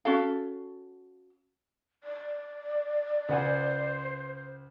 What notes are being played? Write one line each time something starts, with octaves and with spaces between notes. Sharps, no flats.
C#4 F#4 A4 F5
D5
C#2 C5 F#5 G#5